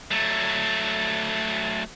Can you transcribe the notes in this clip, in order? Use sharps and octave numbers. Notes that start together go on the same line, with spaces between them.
F#3 A3